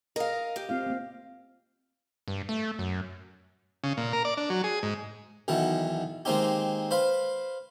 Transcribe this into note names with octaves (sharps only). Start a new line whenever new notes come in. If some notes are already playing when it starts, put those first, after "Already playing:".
A#4 D#5 F5
G4
C4 F4 F5
A#3 C4
G2
A3
F#2
C#3
A#2
A#4
D5
D4
F#3
G#4
G#2
B1 B2 D#3 E3 F#5
D#3 G#3 A#3 C4 D#4 G4
B4 C5 F5